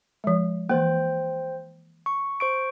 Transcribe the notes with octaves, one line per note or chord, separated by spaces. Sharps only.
F3 G#3
E3 A#3 C5 G5
C#6
C5 C#6 D7